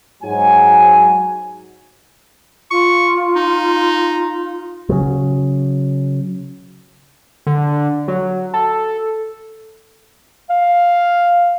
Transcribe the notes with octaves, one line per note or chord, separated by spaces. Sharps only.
G#2 F#3 G#5
F4 C#6
D#4
C#3 F#3
D3
F#3
A4
F5